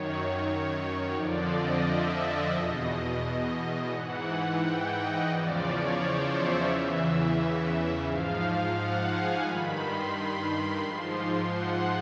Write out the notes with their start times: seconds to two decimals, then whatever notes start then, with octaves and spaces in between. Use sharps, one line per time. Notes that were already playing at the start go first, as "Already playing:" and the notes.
Already playing: F#2 D#3 C#5
1.14 F2 D3 F3 D5
1.49 D#5
1.84 E5
2.17 D#5
2.52 E2 B2
3.91 G#2 E3 F#5
4.59 G5
4.95 D#5
5.29 E2 C#3 F3 D5
5.63 C#5
5.98 C5
6.32 E5
6.67 E2 C#3 E3 E5
8.04 G#2 F3 F5
8.74 F#5
9.09 G#5
9.43 G2 D#3 B5
9.77 C6
10.12 C6
10.81 G#2 F3
11.50 F#5